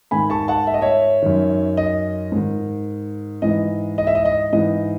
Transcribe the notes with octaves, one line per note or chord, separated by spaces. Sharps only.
G#2 D#3 G#5 B5
A5 C#6
F#5 A5
E5
D#5
C#5 E5
F#2 D#3
D#5
G#2 D#3
G#2 E3 D#5
D#5
E5
D#5
D#5
G#2 E3 D#5